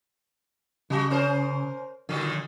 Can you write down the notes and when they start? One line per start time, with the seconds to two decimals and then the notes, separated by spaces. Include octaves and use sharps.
0.90 C#3 F#3 F#4
1.11 C#4 A#4 C5
2.09 A#2 D3 D#3 F3